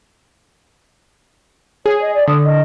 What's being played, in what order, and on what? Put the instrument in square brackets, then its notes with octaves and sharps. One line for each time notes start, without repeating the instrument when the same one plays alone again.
[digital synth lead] G#4 [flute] C#5
[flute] D#5
D5
[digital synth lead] D3 [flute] D#6
[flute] D#5